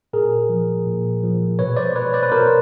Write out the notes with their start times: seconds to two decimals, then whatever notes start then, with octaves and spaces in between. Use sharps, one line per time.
0.13 A#2 G#4 A#4
0.49 F3
0.86 A#2
1.23 F3
1.59 B2 B4 C#5
1.77 C5 D5
1.96 B4 C#5
2.13 C5 D5
2.23 B4
2.31 B2 A#4 C5